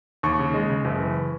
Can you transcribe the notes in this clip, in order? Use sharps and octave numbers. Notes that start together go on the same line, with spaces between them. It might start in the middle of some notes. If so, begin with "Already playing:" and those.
D#2 C#6
C#3
G#3
C#3
F#1
E3